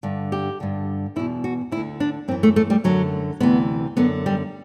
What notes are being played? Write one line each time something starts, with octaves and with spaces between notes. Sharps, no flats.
G2 D3
G4
G2 D3
E2 B2 E4
F#4
D2 E4
D3
D4
F#2 E3 C4
A3
A3
G3
F#2 D3 F#3
D2 C3 E3 B3
F#2 D3 B3
G3